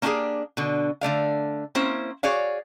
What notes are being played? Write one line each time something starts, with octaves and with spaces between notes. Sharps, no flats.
A#3 C#4 D4 E4 G4 G#4
B2 D3
D3 A3 D5 F5
A#3 C4 C#4 E4 C5
F#4 G#4 C#5 D5 F5